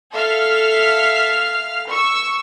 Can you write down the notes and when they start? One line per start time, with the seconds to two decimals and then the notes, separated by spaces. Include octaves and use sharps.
0.11 A4 E5 F5 F6 B6
1.88 C#6 E6